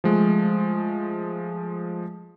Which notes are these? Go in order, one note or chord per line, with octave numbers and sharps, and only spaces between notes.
F3 G#3 A3